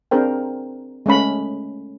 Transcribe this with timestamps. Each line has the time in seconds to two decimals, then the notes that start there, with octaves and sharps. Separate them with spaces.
0.11 C4 D4 G#4 A#4 C5 G5
1.06 G#3 A3 C#4 B5